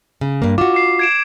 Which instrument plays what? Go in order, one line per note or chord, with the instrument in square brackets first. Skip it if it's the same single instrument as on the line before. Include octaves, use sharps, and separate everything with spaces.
[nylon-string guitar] C#3
G2 A#3
[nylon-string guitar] F4 F#4 [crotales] D6
[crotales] D6 C7
G#6 D7 E7